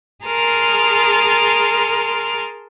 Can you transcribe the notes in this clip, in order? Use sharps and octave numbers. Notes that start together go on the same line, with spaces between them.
G#4 A#4 A5 C6 F6